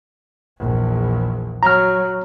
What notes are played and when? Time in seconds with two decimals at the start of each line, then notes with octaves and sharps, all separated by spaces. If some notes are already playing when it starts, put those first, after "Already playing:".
0.58 A#1 E2
1.63 F#3 A#5 F6